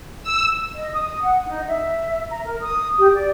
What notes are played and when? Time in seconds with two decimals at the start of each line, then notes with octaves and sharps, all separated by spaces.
0.23 E6
0.76 D#5
0.93 D#6
1.23 F#5
1.46 D#4
1.68 E5
2.29 A#5
2.45 A#4
2.61 D#6
2.98 G4
3.14 D5